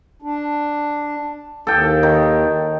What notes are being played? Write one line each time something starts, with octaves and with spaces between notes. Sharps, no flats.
D4
D#2 A4 G5
D#3